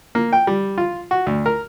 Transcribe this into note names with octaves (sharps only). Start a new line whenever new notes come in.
A#3
G5
G3
F4
F#4
D2
A#4